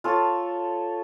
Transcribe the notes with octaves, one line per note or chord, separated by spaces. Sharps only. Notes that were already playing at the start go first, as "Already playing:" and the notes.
F4 A4 C#5